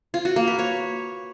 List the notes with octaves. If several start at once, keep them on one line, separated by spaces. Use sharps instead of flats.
F4
F#4
A#3
B4
C#5